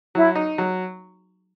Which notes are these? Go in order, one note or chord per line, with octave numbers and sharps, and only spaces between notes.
F#3 E4
D#4
F#3